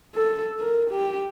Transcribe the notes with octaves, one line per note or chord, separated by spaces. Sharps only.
A4
A#4
G4